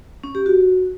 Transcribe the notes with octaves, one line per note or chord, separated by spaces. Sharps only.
C#4
G4
F#4